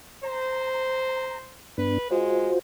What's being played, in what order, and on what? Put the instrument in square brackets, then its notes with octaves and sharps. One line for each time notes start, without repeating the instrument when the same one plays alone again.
[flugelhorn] C5 [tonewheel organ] A#5
[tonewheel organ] G2 B3 D4 [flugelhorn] B4
[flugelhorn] G#3 [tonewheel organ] F4 F#4 C5